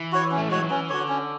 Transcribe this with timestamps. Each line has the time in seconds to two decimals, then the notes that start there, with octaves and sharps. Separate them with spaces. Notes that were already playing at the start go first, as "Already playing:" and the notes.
Already playing: E3
0.12 F#4 C#5
0.31 C#4
0.38 A3
0.49 G#3 F#4 C#5
0.59 F#3
0.70 E3 C#4
0.89 D3 F#4 C#5
1.08 C#4